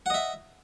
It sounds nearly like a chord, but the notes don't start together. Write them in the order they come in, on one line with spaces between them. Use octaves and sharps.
F#5 D#5 E5